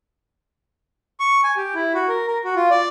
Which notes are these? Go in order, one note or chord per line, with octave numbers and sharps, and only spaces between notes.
C#6
G#5
G4
E4
F#4
A#4
A#4
F#4
F4
D5